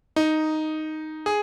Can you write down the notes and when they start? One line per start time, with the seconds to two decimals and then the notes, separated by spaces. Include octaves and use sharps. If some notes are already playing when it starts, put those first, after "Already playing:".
0.16 D#4
1.26 G#4